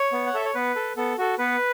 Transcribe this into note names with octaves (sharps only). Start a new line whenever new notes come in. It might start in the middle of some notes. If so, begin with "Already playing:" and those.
Already playing: C#5
B3
F#5
A4 E5
C#5
B3 B4
A4
B3 A4
F#4 A4
B3 B4